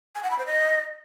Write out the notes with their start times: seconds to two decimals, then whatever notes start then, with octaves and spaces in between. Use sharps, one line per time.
0.15 G#5
0.23 F#5
0.31 B5
0.39 C5
0.46 D#5